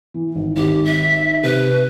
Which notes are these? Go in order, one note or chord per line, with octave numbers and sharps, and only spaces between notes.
E3
G#1
G#1 G4
E5
C3 B4